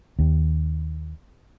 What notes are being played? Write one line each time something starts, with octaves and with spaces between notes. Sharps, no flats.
D#2